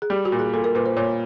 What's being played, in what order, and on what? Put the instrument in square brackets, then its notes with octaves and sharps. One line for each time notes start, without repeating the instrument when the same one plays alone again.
[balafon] G#4
[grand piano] G3 [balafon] G4
[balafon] F#4
[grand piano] A#2
[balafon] G#4
[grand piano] A#2 [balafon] A4
[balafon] A#4
[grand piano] A#2 [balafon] B4
[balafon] C5
[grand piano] A#2 [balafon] C#5